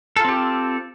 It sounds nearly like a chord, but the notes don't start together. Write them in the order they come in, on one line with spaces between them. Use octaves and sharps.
A4 F4 C4 G4